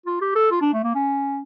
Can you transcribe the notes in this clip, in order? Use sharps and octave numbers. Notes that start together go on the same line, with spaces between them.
F4
G4
A4
F4
D4
A3
A#3
C#4